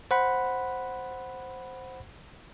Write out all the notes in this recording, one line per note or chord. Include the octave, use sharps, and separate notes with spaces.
C5 F#5 B5